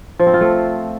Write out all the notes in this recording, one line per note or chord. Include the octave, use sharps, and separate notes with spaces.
F3
C4
F4
A3